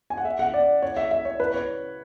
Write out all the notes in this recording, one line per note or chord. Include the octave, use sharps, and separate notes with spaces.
G#5
F#5
E5
F#5
D5
C#5
E5
E5
C#5
B4
C#5